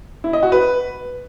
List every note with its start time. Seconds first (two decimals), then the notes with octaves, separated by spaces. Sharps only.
0.24 E4
0.33 D#5
0.43 F#4
0.52 B4